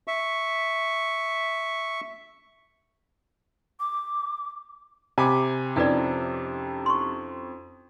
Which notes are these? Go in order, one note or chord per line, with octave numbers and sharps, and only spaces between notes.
E5 C#6
D6
C3 G#5 B5 D6
F2 C#4 D#4 E4 A4 B4 D5
C6 C#6